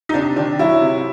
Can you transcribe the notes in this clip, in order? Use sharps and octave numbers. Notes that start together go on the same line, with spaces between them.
D#4
C3 D4
D#3 D4
F#3 E4
C3